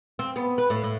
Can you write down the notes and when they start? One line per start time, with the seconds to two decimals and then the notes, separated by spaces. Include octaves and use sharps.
0.19 C4
0.36 B3
0.58 B4
0.70 A2
0.84 A2